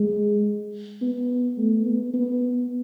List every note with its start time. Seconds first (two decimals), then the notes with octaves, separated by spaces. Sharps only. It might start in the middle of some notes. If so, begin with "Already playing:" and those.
Already playing: G#3
1.01 B3
1.57 A3
1.86 B3
2.14 B3